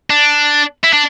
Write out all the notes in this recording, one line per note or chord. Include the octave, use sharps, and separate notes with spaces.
D4
E4
D4